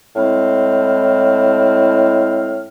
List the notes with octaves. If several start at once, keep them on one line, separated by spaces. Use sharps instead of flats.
A2 G#3 C4 E4 F6